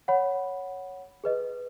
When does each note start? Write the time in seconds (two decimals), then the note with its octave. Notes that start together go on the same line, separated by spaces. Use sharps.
0.08 C#5 F#5 B5
1.24 G#4 B4 D#5